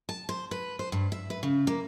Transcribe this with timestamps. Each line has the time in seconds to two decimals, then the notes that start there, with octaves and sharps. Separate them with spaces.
0.09 A5
0.29 C5
0.51 B4
0.79 C5
0.92 G2
1.12 E5
1.30 B4
1.43 C#3
1.67 A#3